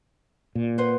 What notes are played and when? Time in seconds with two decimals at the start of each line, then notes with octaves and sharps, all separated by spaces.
0.55 A#2
0.78 B4 C5 F#5